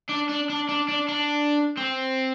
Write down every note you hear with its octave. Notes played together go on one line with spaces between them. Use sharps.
D4
D4
D4
D4
D4
D4
C4